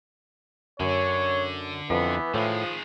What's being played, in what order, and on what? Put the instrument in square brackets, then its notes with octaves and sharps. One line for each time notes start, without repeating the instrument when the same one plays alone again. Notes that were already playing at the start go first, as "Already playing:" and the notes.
[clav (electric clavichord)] F#2 [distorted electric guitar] D3 [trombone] C#5
[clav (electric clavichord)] F2 [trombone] E3 [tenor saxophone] B3
[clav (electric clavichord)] A2 [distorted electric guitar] D#3 G#3 [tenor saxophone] F3